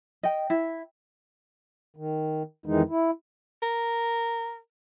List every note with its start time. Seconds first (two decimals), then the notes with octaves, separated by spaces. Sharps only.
0.23 D#5 G5
0.50 E4
1.96 D#3
2.66 F2 D#3 E3 G#3 D#4
2.89 E4
3.63 A#4